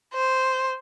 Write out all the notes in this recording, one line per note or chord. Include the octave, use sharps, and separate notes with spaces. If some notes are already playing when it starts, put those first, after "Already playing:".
C5